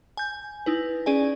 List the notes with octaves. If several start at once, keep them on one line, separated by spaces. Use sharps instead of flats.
G#5 G6
D#4 E4 B4
C#4 G#4 D5 G#5